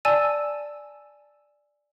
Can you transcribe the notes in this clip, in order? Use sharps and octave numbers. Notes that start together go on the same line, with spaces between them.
D5 G#5 A5 E6 D#7